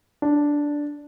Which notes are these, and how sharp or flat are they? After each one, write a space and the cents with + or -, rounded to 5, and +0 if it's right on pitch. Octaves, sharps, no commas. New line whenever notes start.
D4 -5